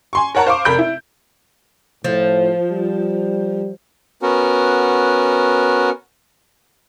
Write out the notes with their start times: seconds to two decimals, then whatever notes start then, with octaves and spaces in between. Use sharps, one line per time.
0.13 G#5 C6 C#6
0.35 A#4 C#5 F#5 A5 A#5
0.46 C5 F5 C#6 D6
0.65 F1 A#4 B5 G6 D7
0.78 E4
2.04 A2 F3
2.71 G3
4.22 B3 C#4 F#4 A#4